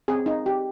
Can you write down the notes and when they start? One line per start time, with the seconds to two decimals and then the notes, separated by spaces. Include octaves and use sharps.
0.08 C4 G#4
0.26 D#4
0.46 G4